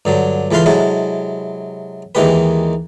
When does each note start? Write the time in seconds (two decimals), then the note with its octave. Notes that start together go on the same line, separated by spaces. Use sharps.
0.05 G2 D3 F#3
0.51 C#2 E3 A4 B4 F5 C6
0.66 C3 F#3 G#3 E4 A4
2.15 D#2 D#3 E3 G#3 G4 B4